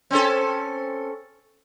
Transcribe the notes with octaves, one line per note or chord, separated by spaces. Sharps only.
C4 C#4 A4